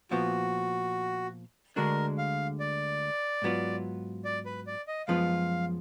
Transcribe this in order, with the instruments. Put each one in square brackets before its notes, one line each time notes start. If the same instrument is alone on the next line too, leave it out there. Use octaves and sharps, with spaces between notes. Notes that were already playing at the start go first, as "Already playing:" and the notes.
[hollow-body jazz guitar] A#2 F3 B3 [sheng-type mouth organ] F#4
[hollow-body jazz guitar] D2 D3 G#3 D4 F#4 [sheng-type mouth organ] A#4
[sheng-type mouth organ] F5
D5
[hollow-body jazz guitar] G#2 F#3 B3 F4
[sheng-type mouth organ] D5
B4
D5
D#5
[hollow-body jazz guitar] F#2 F3 G#3 B3 F4 [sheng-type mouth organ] F5